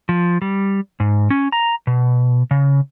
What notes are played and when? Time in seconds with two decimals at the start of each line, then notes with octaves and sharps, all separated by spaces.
0.09 F3
0.42 G3
1.00 G#2
1.30 C#4
1.52 A#5
1.87 B2
2.51 C#3